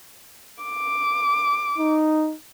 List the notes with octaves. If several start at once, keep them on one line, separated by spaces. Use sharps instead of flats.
D6
D#4